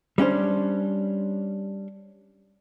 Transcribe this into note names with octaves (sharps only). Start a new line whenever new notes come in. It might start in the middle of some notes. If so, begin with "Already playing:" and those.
G3 C#4 D4 C5